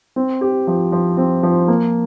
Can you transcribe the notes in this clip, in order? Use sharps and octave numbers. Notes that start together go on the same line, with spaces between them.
C4
G4
F3
F3
C4
F3
A#3